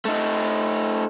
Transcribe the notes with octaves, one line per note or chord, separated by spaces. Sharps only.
A3 D#4